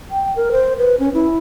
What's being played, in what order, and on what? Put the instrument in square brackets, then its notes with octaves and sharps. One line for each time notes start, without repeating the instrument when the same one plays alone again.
[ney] G5
A#4
C5
B4
C#4
E4